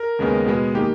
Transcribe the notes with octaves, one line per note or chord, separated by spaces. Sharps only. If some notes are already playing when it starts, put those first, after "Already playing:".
Already playing: A#4
D#2 C#3 G#3 B3
B2 G#3 B3
D#3 A#3 G4